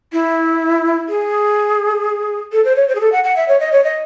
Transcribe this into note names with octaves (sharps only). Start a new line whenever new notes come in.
E4
G#4
A4
C5
C#5
C5
G#4
A4
F#5
F#5
E5
C#5
D#5
C#5
D#5